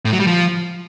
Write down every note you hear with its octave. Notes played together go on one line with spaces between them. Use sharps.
A2
F#3
G3
F3